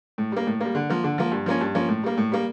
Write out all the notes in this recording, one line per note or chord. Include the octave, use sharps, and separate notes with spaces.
A2
G3 A#3
A2
G3 A#3
D3
F3 A#3
D3
F3 A#3
G2
F3 A#3 C#4
G2
F3 A#3 C#4
A2
G3 A#3
A2
G3 A#3